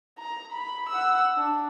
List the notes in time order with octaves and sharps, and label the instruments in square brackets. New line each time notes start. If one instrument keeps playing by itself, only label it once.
[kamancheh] A#5
B5
F#5 E6
D4